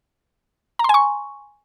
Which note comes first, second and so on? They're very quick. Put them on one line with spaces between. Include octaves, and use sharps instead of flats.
A#5 C6 G#5 C#6